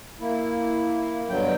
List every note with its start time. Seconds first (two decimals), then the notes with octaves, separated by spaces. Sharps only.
0.21 A#3 E4
1.29 G2 B2 D3 F#3 G5